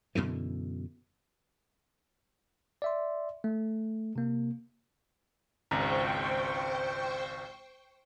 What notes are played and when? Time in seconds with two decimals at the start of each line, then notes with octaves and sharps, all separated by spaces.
0.15 F#2 B2 D3 E3
2.82 D5 E5 C6
3.44 A3
4.16 C3 A#3
5.71 G#1 C#2 C5 G5 A#5 C#6